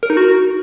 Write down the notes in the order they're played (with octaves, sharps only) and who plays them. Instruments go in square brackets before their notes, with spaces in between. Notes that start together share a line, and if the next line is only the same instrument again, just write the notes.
[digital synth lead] A#4
D#4
F#4